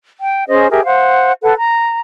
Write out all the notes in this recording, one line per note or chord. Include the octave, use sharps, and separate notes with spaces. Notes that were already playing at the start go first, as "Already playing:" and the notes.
G5
C#4 G#4 C5 D#5
G4 G#4 A#4 E5
C5 F5 F#5
A4 B4 F#5
A#5